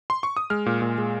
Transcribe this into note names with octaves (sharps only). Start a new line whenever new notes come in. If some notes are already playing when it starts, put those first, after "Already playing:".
C6
C#6
D#6
G#3 F6
A#2
A#2
G#3